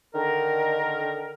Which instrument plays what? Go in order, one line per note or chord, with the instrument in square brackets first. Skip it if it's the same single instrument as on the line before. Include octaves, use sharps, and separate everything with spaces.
[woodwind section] D3 D#3 A#4